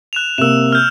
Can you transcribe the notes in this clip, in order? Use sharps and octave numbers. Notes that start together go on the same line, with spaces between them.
F#6 E7 F7
C3 A#3 E6 E7
F6 G6